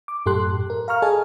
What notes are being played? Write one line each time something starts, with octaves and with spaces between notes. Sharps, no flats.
D6
F#2 A2 G4 A4 C6 F#6
A#4
F5 A#5 C#6 F6
G#4 A4 D#5 G#5 A5